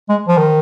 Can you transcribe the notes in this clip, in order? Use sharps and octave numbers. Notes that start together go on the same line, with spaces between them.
G#3
F3
D#3